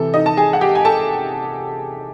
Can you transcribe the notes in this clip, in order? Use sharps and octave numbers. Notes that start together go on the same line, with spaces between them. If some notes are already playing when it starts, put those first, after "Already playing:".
Already playing: C3 E3 A4
D#4 D#5
A5
G#4 G#5
F#5
G4 G5
G#5
A4 A5